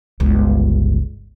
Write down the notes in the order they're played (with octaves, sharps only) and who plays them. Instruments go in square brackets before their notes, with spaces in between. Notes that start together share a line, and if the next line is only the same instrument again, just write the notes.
[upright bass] G1 C#2